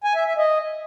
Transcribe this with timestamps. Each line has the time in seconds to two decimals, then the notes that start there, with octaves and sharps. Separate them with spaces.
0.04 G#5
0.15 E5
0.26 E5
0.37 D#5